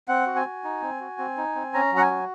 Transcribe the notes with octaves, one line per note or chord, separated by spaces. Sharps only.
C4 F#5
F#4
G#5
F#4
D#4
C4
F#4
C4
D#4
C4
C#4 A#5
F#3 F#5
G#5
F#4